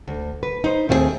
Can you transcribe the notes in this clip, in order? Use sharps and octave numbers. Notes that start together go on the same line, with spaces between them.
D2
B4
D#4 C5
D#2 A3 C4 F4 G#4